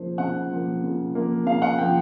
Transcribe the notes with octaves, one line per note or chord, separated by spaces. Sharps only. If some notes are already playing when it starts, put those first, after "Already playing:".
Already playing: C#3 F3 A#3 C5
C#3 F#5
F3 A#3
C#3
F3 A#3
C#3 F5
F#5
F3 A#3 G5